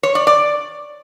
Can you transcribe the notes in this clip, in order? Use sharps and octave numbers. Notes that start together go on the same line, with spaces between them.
C#5
D5
D5